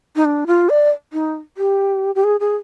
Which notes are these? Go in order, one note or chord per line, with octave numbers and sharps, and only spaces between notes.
D#4
D4
F4
D5
D#4
G4
G4
G#4
G#4